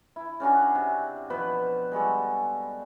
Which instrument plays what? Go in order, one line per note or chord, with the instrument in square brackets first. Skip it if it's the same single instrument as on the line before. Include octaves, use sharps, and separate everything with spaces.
[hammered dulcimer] E4
C#3 C#4 D4 F#4
C3
B2 F3 B4 C5
G3 G#3 F#4 A4